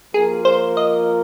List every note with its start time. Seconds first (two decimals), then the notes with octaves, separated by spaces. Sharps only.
0.13 F3 A#3 F4 G#4 A#4
0.45 C5
0.77 D#5